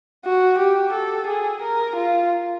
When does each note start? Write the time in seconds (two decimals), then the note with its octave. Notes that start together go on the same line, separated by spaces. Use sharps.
0.24 F#4
0.58 G4
0.93 A4
1.27 G#4
1.61 A#4
1.96 F4